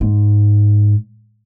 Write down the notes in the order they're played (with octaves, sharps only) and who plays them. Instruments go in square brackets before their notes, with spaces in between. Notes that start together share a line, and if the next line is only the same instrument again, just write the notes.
[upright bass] G#2